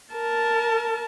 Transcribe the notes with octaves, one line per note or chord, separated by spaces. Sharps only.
A#4 A5